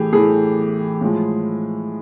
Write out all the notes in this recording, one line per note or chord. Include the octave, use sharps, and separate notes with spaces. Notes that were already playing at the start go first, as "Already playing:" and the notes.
Already playing: A2 E3 A3 G4 G#4
A2 E3 A3 G#4
A2 F3 G#3